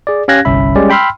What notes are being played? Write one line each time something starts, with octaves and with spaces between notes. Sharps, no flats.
G#4 D5
C#4 G4 F5 F#6 G#6 A#6
G1 C2 C#4 E5 B5
G3 G#3 C#4 G4 D5
G5 B5 C6 E6 F6